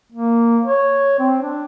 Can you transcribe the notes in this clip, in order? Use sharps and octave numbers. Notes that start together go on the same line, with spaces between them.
A#3
C#5
C4
D4